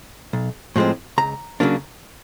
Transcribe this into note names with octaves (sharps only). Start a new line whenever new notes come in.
B1
A2 F3 G#3 C4
C#2 A#5
C#3 F#3 A#3 D4